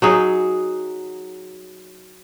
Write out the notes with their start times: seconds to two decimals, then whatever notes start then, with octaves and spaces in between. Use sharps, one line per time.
0.02 F#3 D#4 G#4